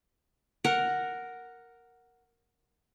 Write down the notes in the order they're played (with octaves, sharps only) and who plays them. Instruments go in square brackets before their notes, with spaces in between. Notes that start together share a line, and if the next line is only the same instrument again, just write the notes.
[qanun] A#4 F#5